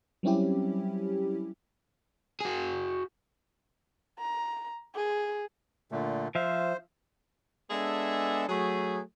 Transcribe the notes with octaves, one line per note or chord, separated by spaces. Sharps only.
F#3 G3 C4 C#4 E4 G4
F#4 G#4
A#5
G#4
A#2 D3 A3
F3 C5 E5 F5
G#3 B3 D4 G#4 A4 E5
F#3 A3 G#4